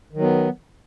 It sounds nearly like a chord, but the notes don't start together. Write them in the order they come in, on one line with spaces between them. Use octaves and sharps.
D#3 F#3 B3